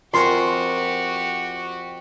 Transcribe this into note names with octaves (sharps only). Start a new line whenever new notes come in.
F2 F#4 G4 A#4 G#5 C6